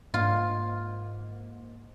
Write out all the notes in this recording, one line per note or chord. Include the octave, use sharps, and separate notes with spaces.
G#2 A#3 F4